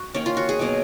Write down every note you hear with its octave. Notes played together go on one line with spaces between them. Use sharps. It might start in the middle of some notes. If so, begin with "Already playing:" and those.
Already playing: F#4
D#3 A#3 C#4
F4
F#4
G#4
B2 F#3 A#3